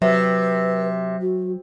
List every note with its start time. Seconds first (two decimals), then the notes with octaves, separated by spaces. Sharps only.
0.02 C3 F#3 B4
1.21 F#4